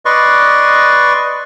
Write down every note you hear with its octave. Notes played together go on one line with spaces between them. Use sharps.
B4 D5 D#5 C6 C#6